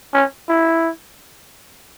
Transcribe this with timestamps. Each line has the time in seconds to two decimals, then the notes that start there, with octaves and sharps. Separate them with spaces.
0.14 C#4
0.49 E4